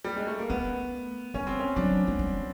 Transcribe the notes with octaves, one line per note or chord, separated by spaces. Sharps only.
G3
G#3
A3
A#3
A3 B3
G3 C#4
C4
C#4
F#3 D4
G#3
G3